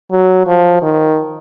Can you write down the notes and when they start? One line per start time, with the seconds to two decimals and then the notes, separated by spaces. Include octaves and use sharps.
0.11 F#3
0.47 F3
0.82 D#3